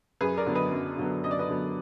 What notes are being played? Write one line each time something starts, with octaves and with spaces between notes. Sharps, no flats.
F#2 G#4 B4
A#4 D5
D3 F#3 B3
B4 D#5
F#2
D3 F#3 B3
F#2 D#5
D5
B4 D#5
D3 F#3 B3